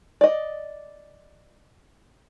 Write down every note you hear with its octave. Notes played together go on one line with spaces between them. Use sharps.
D5 D#5